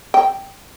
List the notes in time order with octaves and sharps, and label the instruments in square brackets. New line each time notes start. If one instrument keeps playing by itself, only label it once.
[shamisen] G5